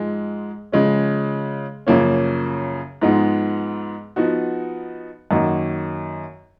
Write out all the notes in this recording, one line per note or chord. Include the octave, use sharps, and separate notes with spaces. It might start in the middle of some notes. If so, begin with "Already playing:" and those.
Already playing: G#2 F3 G#3
C#3 F3 G#3 C#4
F#2 C#3 F3 A#3 C#4
G#2 F3 G#3 B3 D#4
F3 B3 D#4 F#4
F#2 D#3 A#3 D#4 F#4